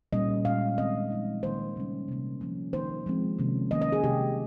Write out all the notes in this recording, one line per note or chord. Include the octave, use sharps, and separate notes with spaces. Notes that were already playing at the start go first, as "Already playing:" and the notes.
A#2 G3 A#3 C#4 D#5
A#2 G#3 C#4 F5
D#3 G#3 C4 D#5
F3 G#3 D#4
D#3 A#3 D#4 C5
C#3 G3 C#4
C3 G3 A#3 C#4
F3 A#3 C#4
D#3 A#3 D#4 C5
F3 G#3 C4
C3 D#3 A#3 C#4
D#3 A#3 C#4 D#5
D#5
G#4
C3 D#3 G#3 G4